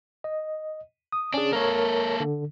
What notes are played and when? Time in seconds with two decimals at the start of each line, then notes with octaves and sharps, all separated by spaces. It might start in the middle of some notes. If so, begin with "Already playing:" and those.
0.24 D#5
1.12 D#6
1.34 C#4 D4 G#4
1.53 A#3 A4 A#4 C#5
2.20 D3